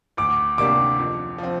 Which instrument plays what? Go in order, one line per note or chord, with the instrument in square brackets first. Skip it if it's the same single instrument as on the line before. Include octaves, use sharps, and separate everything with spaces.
[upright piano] D2 [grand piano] D6
[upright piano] C3 A#3 D4 G4 [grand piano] D6
[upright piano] F2
F3 C4